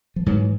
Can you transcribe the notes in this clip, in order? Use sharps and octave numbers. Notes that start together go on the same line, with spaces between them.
F3
G#2 E3 F#3